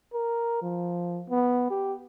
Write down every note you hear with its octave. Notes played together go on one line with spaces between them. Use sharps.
A#4
F3
B3
G4